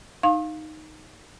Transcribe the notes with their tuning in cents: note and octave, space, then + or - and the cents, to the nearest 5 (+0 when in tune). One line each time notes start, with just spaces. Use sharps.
D#4 +0 F5 +10 C6 +45